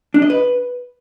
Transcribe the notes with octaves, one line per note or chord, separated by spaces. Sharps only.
D4
D#5
B4